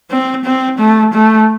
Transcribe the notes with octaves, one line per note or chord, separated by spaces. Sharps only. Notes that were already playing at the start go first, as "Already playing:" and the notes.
C4
C4
A3
A3